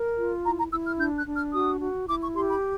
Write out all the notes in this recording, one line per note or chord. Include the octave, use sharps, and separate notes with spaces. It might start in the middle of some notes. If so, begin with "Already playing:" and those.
Already playing: A#4
F4
E4 A#5
A#5
E4 E6
F6
D4 G6
F#6
D4
F6
F#4 D#6
F#4
E4 D6
C#6
G4 C6
B5